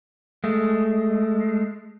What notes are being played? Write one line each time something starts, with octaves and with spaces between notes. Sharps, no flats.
G#3 A3